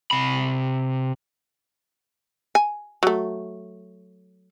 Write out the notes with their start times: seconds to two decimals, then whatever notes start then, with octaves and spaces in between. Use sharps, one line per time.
0.11 C3 B5
2.55 G#5
3.03 F#3 A3